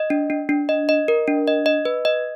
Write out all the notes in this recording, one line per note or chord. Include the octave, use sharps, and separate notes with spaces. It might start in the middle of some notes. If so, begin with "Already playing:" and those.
Already playing: D#5
D4
D4
D4
D#5
D#5
A#4
D4
D#5
D#5
B4
D#5